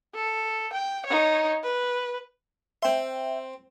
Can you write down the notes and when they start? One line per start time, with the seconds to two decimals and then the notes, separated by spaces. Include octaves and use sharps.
0.14 A4
0.73 G5
1.07 D#4 C#5
1.63 B4
2.83 C4 E5 G5 C6